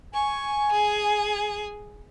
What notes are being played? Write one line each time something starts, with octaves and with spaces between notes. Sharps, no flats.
G#5 C#6
G#4